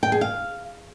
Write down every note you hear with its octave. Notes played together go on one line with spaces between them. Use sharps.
G5
G#4
F5